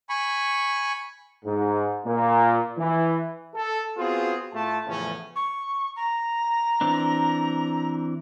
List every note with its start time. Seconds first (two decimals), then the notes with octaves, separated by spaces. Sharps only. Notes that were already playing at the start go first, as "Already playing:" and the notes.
0.09 G#5 B5 C#6
1.45 G#2
2.05 A#2
2.78 E3
3.54 A4
3.97 B3 C4 F4 F#4 G#4
4.53 A2 A3 F4 A5
4.87 E2 A2 C#3 E3 F3 C#4
5.36 C#6
5.96 A#5
6.81 E3 C4 D4